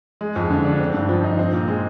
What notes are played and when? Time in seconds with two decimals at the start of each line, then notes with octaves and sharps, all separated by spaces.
0.21 G#3
0.36 F2
0.50 D3
0.65 D4
0.79 C4
0.94 G2
1.09 F3
1.24 D#4
1.39 C4
1.53 A#2
1.68 G#3